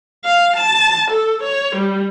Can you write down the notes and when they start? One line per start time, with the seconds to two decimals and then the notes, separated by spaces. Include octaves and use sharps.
0.25 F5
0.56 A5
1.10 A4
1.43 C#5
1.76 G3